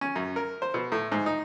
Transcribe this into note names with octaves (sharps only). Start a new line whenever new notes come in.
C#4
F#2
A#4
C5
B2
A2
G#2
D#4